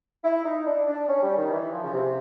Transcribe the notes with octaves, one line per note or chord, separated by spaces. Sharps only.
E4
D#4
D4
D4
C#4
G3
D#3
E3
F3
C#3
C3